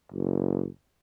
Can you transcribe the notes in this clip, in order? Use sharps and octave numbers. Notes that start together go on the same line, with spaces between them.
F#1